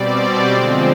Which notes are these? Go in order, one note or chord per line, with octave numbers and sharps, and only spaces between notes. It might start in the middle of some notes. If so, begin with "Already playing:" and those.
Already playing: B2 G3 C4 D5
D3 F3 G#3 C4